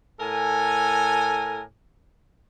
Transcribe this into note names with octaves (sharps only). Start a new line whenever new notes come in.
A2 A4 A#4 G#5